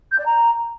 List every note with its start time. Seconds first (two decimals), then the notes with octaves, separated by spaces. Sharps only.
0.11 G6
0.18 D5
0.25 A#5